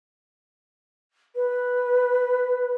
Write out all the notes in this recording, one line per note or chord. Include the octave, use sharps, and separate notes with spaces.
B4